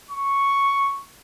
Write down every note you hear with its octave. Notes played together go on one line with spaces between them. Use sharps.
C#6